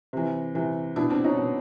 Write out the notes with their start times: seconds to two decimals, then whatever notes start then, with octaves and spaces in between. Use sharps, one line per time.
0.13 C3 E3
0.55 C3 E3
0.96 B2 D4 E4
1.10 C4 D4
1.24 C#4 D#4
1.38 B2